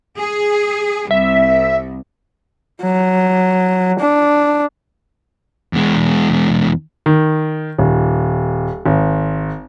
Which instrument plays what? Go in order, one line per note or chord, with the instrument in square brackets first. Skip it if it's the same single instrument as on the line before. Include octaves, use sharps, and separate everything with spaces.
[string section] G#4
[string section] C2 [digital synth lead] E5
[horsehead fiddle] F#3
D4
[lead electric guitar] E2 G#3
[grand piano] D#3
D#1
G#1